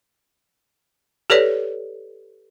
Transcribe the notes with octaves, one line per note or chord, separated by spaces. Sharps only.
G4 A4 B4 C#5 D5